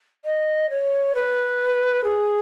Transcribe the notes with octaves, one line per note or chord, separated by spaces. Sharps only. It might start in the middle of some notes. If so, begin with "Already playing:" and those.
D#5
C#5
B4
G#4